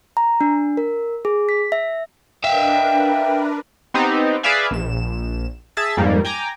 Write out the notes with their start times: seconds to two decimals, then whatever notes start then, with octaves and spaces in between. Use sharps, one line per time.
0.17 A#5
0.41 D4
0.77 A#4
1.25 G#4
1.49 B6
1.72 E5
2.44 D4 A#4 B4 E5 F5 G5
3.94 B3 C4 D#4 G4
4.43 G#4 B4 D5 E5 F5 G#5
4.71 A#1 E7
5.77 G#4 E5 A5 E6 A6
5.97 F2 G#2 G3 A#3
6.25 G5 G#5 A#5 D6